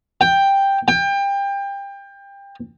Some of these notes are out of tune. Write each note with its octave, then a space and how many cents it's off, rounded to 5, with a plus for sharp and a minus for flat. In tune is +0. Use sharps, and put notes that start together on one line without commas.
G5 +5
G5 +25